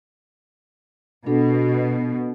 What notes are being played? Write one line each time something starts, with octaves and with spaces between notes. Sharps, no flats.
B2 D4 F#4 A4